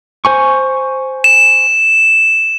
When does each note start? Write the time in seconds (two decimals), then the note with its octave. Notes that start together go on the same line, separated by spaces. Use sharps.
0.25 C5 G#5 C#6
1.24 E7